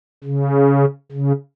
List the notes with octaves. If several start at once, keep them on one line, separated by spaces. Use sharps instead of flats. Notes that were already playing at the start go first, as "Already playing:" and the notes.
C#3
C#3